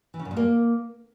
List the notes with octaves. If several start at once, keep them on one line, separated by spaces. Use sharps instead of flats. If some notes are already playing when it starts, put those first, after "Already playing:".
E3
C#3
F#2
A#2
A#3